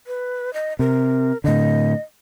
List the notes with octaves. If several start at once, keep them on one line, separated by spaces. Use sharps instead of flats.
B4
D#5
C3 A#4
A2 D3 D#5